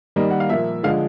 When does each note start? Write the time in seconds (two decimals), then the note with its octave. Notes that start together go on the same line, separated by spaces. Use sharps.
0.16 D#3 G3 A#3 D#5
0.31 F#5
0.40 F5
0.49 A#2 F3 A#3 E5
0.83 D3 F3 G#3 F5